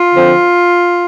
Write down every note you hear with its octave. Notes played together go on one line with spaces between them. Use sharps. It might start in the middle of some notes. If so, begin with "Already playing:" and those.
Already playing: F4
D3 F3 C4